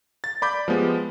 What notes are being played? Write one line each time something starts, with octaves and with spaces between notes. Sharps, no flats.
A6
D5 B5 D6 G6
F3 G#3 B3 G4